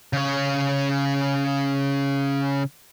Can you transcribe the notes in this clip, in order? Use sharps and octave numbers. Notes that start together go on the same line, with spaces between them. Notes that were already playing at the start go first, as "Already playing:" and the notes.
C#3 C#5